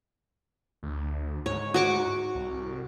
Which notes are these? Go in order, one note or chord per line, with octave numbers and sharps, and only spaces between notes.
D2
G#2 C#5
F#4 C#6 D6
C2